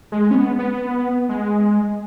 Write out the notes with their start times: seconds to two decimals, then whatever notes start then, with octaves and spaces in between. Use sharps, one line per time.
0.12 G#3
0.31 C#4
0.35 B3
0.59 B3
1.29 G#3